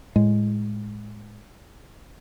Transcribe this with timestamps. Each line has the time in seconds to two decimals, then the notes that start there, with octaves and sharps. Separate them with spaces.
0.16 A2 G#3